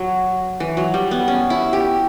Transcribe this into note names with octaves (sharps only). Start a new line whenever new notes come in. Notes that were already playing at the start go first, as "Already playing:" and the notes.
Already playing: F#3
E3
F#3
G3
B3
C#4
E4
G4